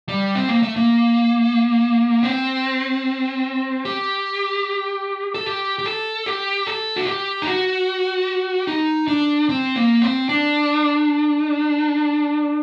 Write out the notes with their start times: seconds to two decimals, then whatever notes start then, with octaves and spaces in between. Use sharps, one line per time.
0.09 G3
0.35 C4
0.49 A#3
0.63 A3
0.76 A#3
2.23 C4
3.85 G4
5.34 A4
5.46 G4
5.79 G4
5.86 A4
6.26 G4
6.67 A4
6.96 F#4
7.07 G4
7.42 D#4
7.47 F#4
8.67 D#4
9.08 D4
9.49 C4
9.76 A#3
10.02 C4
10.29 D4